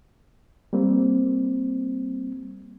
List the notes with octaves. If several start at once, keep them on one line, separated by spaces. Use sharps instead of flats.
G3 A#3 C4